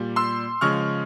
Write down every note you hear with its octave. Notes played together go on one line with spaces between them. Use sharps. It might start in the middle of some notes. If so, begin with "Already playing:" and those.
Already playing: A#2 G3
C6 E6
C#3 F3 G#3 C#6 F6